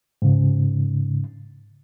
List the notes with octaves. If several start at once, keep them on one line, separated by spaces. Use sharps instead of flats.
G#2 C#3